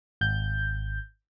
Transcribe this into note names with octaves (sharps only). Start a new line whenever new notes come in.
G#1 G6